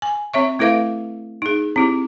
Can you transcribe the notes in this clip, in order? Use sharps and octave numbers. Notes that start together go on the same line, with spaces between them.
G#5
C4 C#5 E5 C#6
A3 E4 A4 B4 E5 F5
D#4 G#4
C4 E4 G4